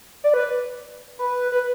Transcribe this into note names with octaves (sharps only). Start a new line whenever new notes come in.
D5
B4
B4
B4